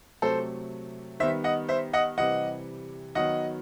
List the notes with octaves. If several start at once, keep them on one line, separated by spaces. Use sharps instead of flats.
C3 F#3 A3 A4 C5
D#3 G3 B3 C5 E5
D#5 F#5
C5 E5
D#5 F#5
C3 E3 G3 D#5 F#5
D#3 F#3 B3 D#5 F#5